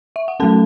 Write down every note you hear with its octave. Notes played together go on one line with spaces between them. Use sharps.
E5
F#5
F#3 A3 C#4 A4 A5